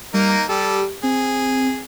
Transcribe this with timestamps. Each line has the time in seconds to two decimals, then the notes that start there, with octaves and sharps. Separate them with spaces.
0.14 G3 A#3 D#4 A#4
0.49 G3 G4 A4
1.03 C4 G#4